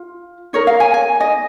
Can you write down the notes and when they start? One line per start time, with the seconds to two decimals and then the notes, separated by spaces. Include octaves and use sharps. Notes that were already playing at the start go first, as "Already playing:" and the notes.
Already playing: F4
0.53 D#4 A#4 C#5
0.67 F5
0.80 G#5
0.94 G#5
1.20 D#5